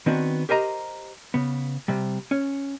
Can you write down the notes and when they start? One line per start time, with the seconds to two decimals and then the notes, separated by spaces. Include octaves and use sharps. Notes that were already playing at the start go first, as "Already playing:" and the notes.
0.06 D#3 B3 C4 D4 F#4
0.49 G4 A#4 C5 D#5 A#5
1.34 C#3 B3
1.88 C3 G3
2.31 C#4